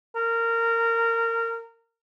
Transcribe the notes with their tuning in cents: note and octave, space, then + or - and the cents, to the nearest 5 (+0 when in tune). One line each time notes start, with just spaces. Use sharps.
A#4 -20